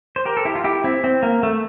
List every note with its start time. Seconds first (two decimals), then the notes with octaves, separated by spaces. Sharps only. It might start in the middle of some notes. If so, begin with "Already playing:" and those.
0.16 C5
0.26 G4 A#4
0.37 A4
0.45 E4 G4
0.55 F4
0.64 E4 G4
0.84 C4 E4
1.04 C4
1.23 A#3
1.43 A3